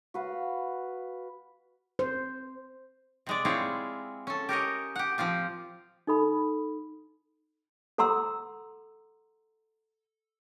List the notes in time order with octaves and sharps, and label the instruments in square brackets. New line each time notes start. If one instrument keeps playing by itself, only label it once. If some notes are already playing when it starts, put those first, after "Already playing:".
[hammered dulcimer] F#4 B4 F5
[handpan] C5
[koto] C3 G#3 D5
C4 E4 F4 G#4 C#5 D5
C#4 A4
G4 A#4 C#5 D#5
G4 F#5
F3 C4 F4 G4
[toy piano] D#4 A4 B5
A4 F#5 A#5 C6 E6